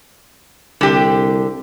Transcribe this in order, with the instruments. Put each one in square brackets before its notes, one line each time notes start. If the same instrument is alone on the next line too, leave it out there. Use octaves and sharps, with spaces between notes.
[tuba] C2 [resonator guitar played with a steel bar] D3 G4